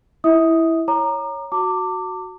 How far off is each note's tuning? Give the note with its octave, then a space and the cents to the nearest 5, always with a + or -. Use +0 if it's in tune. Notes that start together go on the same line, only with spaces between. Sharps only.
E4 +0 E5 -35 D#6 +0
C#5 +0 A#5 +0 D6 +40
F#4 +0 A5 +45 D6 +0